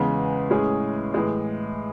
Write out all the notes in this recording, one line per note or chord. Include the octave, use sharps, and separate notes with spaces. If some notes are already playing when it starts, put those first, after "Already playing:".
Already playing: E2 C#3 G#3 B3
A2 G#3 C#4 G#4
A2 E3 G#3